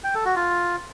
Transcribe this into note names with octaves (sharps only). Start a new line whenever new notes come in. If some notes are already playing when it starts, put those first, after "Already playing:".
G5
A4
F#4
F4